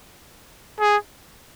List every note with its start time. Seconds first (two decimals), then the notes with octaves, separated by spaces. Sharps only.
0.80 G#4